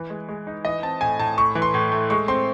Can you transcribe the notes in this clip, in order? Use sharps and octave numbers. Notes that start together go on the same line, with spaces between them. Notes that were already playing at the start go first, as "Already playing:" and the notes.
Already playing: E3
G#3
G#3
D#4
E3 D#5
C4 A5
A2 G#5
A2 A5
A2 C#6
E3
C6
A2
A3
G#3 C#6
C4 C6